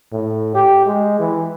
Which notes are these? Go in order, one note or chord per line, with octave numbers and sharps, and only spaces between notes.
A2
G4
G#3
E3